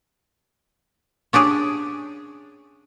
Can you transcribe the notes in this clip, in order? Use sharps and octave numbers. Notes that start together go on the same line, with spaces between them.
C#4 D4 G4 G#4